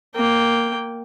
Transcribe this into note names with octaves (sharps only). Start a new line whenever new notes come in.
A#3 G5